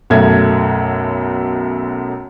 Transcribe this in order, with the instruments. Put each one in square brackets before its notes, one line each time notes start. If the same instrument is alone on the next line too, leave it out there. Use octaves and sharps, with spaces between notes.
[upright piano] B1 F#2 A3 G#6